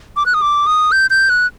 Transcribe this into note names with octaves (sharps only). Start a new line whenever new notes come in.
D6
F#6
D#6
D6
D#6
G6
G6
F#6